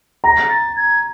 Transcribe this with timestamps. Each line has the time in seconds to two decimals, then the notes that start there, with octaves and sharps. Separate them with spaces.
0.24 A#5 A#6
0.50 A6
0.76 G#6